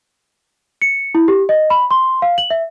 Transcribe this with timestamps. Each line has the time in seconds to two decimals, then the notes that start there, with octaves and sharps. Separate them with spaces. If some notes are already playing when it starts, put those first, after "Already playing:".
0.82 C#7
1.15 E4
1.28 G4
1.49 D#5
1.70 B5
1.91 C6
2.22 F5
2.38 F#7
2.50 E5